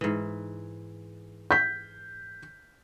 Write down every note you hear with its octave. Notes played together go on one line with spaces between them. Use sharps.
G#2 E3
G6 B6